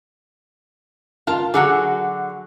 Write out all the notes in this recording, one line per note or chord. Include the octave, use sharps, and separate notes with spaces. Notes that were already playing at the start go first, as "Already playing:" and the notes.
F4 A#4 F5 A5
D3 F#3 F#4 G#4 A4